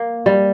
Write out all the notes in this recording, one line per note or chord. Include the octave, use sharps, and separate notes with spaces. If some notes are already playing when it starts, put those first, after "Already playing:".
Already playing: A#3
G3